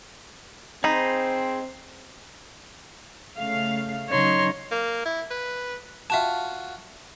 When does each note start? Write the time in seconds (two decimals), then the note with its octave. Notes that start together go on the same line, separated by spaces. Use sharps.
0.84 C4 D#4 G#4 C5 B5
3.37 C#3 A3 F5
4.10 C#3 F#3 D#4 C#5 C6
4.71 A#3
5.05 E4
5.30 B4
6.10 F4 F#4 E5 G#5 A5